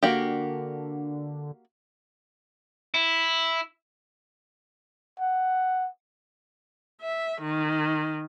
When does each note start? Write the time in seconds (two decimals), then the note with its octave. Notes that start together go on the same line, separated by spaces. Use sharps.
0.03 D3 A#3 F#4 G4
2.94 E4
5.20 F#5
7.01 E5
7.41 D#3